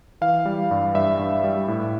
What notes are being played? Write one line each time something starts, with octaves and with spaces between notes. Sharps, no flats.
E3 F5
G3
G2
G2 E5
G2
G3
A2